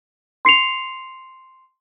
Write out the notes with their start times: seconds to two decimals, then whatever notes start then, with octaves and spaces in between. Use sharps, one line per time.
0.45 C6 C7 C#7 F7